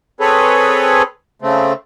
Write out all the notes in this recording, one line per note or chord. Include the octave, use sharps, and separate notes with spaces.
C4 G#4 A4 B4 C#5
C#3 A3 C4